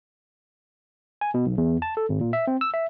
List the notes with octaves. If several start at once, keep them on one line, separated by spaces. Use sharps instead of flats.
G#5
B2
B1
E2
A5
A4
G#1
A#2
E5
C4
E6
E5